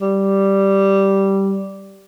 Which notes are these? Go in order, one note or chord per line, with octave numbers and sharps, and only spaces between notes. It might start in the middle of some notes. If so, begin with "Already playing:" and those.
G3